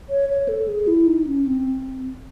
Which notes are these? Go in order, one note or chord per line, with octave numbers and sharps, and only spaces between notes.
C#5
C#5
A4
G#4
E4
D#4
C#4
C4